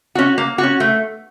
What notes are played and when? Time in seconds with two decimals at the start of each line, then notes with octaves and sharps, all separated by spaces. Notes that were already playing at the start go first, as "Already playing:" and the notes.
0.15 C#4 F#4
0.38 A#3
0.58 C#4 F#4
0.80 A3